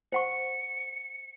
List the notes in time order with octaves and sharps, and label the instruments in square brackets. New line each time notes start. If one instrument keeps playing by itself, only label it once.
[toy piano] C5 F#5 C#6 [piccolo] C#7